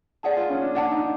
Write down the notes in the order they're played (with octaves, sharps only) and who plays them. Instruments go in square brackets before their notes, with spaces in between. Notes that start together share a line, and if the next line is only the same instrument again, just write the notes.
[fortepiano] G#4 [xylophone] D5 F#5 A5
[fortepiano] F4
C#4
D4
[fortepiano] D4 [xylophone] D5 F#5 A5
[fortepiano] D#4